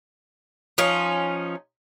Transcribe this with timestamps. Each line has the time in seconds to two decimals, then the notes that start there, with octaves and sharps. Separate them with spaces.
0.78 F3 C#4 D#4